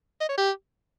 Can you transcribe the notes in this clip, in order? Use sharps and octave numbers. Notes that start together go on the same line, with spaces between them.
D#5
C#5
G4